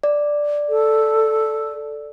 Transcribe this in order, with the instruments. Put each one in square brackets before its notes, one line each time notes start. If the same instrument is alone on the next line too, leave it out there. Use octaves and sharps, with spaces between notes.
[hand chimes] D5
[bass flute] A4